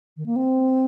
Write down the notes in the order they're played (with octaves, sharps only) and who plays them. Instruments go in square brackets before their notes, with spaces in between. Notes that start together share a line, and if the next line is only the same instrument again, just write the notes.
[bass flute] D#3
A#3
C4